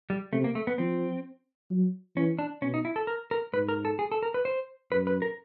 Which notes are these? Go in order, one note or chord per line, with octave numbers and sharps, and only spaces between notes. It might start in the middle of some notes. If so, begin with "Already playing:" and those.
G3
C3 A3
A#3
A3
B3
F3 C4
F#3
E3 C#4
D4
B2 C#4
D#4
E4
A4
A#4
A#4
G#2 B4
A#4
A4
G#4
A4
A#4
B4
C5
F#2 B4
B4
A#4